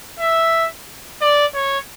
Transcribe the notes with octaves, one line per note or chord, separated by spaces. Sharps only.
E5
D5
C#5